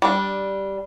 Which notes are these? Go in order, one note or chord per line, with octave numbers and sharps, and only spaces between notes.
G3 D4